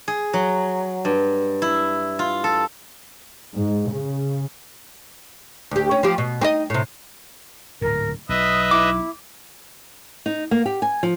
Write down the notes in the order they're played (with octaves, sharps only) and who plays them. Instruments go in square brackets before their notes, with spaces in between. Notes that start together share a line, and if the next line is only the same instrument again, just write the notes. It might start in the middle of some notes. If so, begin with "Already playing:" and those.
[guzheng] G#4
F#3
G2
E4
F4
A4
[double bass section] G#2
C#3
[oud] D2 G4
C#4
F3 G4
B2
C4 D#4 D#5
A2 C3
[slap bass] D1 G#2 [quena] A#4
[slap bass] B1 [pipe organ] B4 D#5 E5 [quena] D#6
[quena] E4 [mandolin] D6
[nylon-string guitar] D#4
A#3
G4
G#5
F3